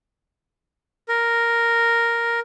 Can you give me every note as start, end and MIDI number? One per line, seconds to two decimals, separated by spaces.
1.09 2.40 70